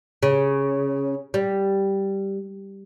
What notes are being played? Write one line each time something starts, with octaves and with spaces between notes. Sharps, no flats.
C#3
G3